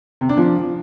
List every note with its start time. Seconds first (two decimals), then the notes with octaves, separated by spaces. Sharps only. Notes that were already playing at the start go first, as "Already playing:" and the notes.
0.21 C3
0.29 D4
0.38 F3